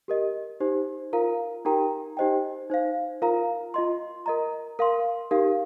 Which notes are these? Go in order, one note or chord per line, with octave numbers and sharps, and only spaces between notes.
G4 A#4 D#5
D#4 G4 C5
F4 A#4 F5 A#5
D#4 G4 A#4 G5 A#5
D#4 G4 C5 D#5 G5
D#4 C5 F5
F4 A#4 F5 A#5
F4 D#5 C6
A#4 D#5 A#5
A#4 F5 C6
D#4 G4 A#4 F5